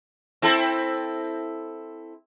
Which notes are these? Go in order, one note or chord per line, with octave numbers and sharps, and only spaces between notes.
C4 E4 A4